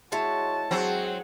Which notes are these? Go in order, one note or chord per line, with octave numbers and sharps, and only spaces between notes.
G#3 E4 F#4 C#5 A5
F#3 C4 G#4 F#5